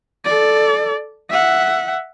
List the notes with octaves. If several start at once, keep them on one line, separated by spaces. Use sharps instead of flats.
A4 D5
E5 F#5